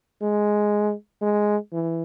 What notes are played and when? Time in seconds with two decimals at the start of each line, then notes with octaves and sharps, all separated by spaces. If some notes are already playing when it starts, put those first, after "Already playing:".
0.22 G#3
1.22 G#3
1.73 E3